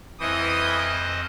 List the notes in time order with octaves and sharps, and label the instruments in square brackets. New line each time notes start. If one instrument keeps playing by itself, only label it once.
[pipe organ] F2 C5 D#5 [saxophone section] E3 [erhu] D#6